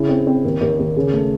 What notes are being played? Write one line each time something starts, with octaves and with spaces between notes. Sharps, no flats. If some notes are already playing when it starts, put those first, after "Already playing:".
Already playing: C#3 E4
C4
C4
D#2
D#2
D#2
C#3
A3